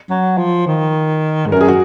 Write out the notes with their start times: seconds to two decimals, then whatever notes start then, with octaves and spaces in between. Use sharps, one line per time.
0.10 F#3
0.37 F3
0.67 D#3
1.46 G#2
1.52 F#2 A#4
1.61 G#4
1.68 F#4